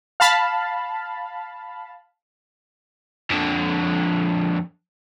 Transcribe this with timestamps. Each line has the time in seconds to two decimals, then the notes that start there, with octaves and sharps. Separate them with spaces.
0.20 F5 A5 B5
3.31 F2 D3